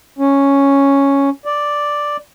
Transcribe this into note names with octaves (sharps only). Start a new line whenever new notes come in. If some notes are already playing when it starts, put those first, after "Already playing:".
C#4
D5